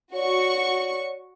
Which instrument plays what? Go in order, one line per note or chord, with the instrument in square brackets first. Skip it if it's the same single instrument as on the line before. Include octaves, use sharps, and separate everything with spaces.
[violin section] F#4 C#6 [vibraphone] C#5 D5